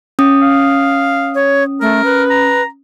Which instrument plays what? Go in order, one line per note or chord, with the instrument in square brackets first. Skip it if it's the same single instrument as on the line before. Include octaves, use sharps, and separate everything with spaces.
[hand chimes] C#4 D#6
[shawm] F5
[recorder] C#5
[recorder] A3 [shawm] A#4
[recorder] B4
[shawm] A#5